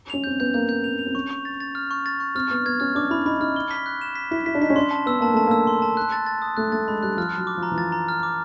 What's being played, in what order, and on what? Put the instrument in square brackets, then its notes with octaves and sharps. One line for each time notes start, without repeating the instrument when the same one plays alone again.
[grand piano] C#4 [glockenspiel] F7
[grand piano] C4 [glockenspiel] G6
[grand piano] B3 [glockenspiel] G6
[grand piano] A#3 [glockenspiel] G6
[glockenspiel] G6
[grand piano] C4 [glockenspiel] F7
[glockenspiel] F7
[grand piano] C4
[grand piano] C#4 [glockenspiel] C#6
[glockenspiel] C#6
A6
A6
F6
C#6
A6
C#6
[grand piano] C4 [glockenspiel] F6
[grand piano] B3 [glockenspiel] F6
[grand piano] B3 [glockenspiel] G#6
[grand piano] C#4 [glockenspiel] F6
[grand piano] D4 [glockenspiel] D6
[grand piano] E4 [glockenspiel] B5
[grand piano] D#4 [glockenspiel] B5
[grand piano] D#4 [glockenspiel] F6
[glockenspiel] G7
B6
F#6
E7
B6
[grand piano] E4 [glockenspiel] B6
[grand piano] E4 [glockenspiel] B6
[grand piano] D4
[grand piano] D#4 [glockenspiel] B6
[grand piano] C#4
[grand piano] D4 [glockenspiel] C6
[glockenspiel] A5
[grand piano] B3 [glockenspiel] E6
[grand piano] A#3 [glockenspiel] A5
[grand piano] A3 [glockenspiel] A5
[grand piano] A#3 [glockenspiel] E6
[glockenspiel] C6
A5
F#6
A6
A6
D#6
[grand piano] A3 [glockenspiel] F#6
[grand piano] A3 [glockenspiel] A6
[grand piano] G#3 [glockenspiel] B5
[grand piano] G3 [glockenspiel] F#6
[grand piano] F3 [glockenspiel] F6
[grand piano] F#3 [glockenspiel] F6
[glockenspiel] D6
[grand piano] F3
[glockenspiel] A#5
[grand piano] E3
[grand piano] F3 [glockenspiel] A6
[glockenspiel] A#5
F6
D6